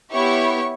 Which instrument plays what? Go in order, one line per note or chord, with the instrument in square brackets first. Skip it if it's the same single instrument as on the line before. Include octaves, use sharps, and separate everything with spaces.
[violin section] B3 E4 G4 C#5 C#6